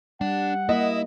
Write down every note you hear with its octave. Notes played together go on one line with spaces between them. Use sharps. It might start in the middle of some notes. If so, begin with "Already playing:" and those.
G3 D4 F#5
A#3 E4 D#5